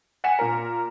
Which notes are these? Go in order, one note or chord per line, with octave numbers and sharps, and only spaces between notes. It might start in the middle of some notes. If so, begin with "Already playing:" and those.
F#5 G#5 B6 C#7 E7
A#2 A#4